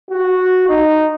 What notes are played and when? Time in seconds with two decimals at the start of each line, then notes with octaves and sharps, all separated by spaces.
0.11 F#4
0.69 D#4